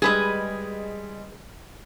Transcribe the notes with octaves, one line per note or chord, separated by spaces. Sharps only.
G3 G#3 G#4 B4 D#5